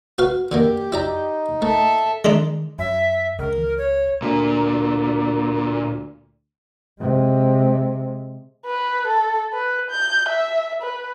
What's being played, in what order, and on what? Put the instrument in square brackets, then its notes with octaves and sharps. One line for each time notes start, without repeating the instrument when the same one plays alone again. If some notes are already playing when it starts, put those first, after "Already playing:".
[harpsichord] F#4 B4 F5
[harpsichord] D3 D#3 A#3 [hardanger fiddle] G4
[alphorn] D#4 [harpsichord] E4 D5 A#5
[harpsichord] A3 [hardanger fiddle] A4 E5
[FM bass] D#3 [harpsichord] G#3 D4 D#4
[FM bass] F#2 [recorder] E5
[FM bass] C#2 [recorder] A#4
[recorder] C#5
[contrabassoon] D2 [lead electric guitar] A#2
[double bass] C3 G#3
[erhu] B4
A4
B4
G6
E5
B4